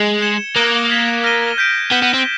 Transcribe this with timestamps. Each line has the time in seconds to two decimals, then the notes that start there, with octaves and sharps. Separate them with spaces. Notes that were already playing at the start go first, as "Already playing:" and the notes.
Already playing: G#3
0.21 G#6 C#7 E7 G7
0.56 A#3 D#6 F#6 A#6 D7 G7
0.90 G#6 B6 E7
1.24 F6 A#6 D#7 G7
1.58 G6 B6 D7
1.91 B3 G6 B6 E7 G7
2.02 B3
2.14 C4